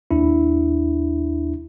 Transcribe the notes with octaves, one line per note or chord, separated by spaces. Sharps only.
D#2 D4 E4